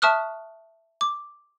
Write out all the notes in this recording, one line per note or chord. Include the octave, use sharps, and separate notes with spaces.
E5 A5 C#6 D#6 F6 F#6
D6